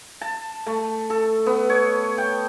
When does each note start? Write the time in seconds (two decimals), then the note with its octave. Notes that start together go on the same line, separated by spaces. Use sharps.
0.21 A5
0.66 A3
1.10 A4
1.46 B3
1.70 C#5
2.18 G5